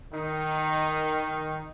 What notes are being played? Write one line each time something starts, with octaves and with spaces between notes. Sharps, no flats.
D#3 D#4